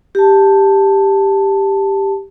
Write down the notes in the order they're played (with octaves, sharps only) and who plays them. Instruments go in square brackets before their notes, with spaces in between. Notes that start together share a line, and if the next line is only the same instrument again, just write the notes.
[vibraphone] G4 A5